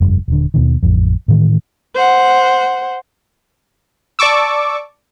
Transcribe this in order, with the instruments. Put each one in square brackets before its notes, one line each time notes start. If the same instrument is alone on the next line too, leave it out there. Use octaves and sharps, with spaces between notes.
[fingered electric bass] F1 G2
D#1 D3
D#2 B2 D#3
A1 F2
A2 D#3 E3
[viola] C5 F#5
[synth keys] D5 A5 C#6 D6 E6